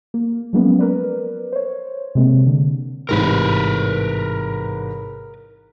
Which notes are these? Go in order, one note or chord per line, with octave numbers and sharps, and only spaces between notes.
A#3
F3 F#3 G#3 A#3 B3 C#4
A#4 B4 D5
C5 C#5
C3 G#3 A#3 C4
D3
A1 G#2 C3 A#4 B4